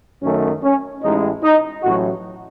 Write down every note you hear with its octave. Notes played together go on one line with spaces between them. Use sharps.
F#2 D#3 A3 C#4
C#4
A1 A2 G#3 D#4
D#4
A1 A2 F#3 F#4